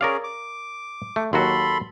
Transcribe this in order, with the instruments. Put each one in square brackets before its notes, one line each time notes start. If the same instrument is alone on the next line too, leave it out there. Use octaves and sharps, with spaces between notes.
[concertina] C#4 G#4 [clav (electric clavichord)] A#4 D5 F5
[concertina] D6
[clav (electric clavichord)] A3
[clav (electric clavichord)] D#2 F#3 F#4 [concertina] A4 B5 C6